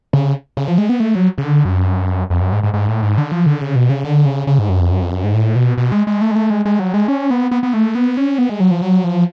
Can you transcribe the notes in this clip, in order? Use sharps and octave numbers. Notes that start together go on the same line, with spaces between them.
C#3
C#3
F3
G#3
B3
A3
F#3
C#3
D3
F#2
F2
F#2
G#2
G#2
G#2
A2
G#2
D3
F3
D3
C#3
B2
C#3
D3
C#3
C#3
G#2
F#2
F2
F#2
F2
F#2
G#2
A2
B2
B2
G#3
G#3
A3
G#3
A3
G#3
G#3
F#3
G#3
C#4
B3
B3
B3
A3
B3
C#4
B3
G#3
F#3
F3
F#3
F3